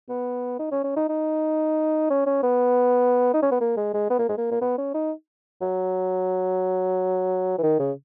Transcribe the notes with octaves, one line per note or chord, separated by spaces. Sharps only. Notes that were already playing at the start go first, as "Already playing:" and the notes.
B3
D#4
C#4
C#4
D#4
D#4
C#4
C#4
B3
D#4
C#4
B3
A#3
G#3
G#3
B3
A#3
G#3
A#3
A#3
B3
C#4
D#4
F#3
E3
D#3
C#3